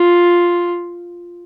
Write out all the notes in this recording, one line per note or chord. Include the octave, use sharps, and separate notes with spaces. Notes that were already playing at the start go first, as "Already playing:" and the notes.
Already playing: F4